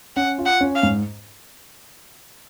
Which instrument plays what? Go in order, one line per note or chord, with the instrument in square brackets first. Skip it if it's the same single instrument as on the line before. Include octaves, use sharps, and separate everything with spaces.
[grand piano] C#4 [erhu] F#5
[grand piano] F4
[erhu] F#5
[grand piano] C#4
[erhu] F5
[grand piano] G#2